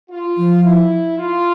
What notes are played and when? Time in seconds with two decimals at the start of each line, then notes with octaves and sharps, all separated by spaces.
0.10 F4
0.38 F3
0.64 E4
1.18 F4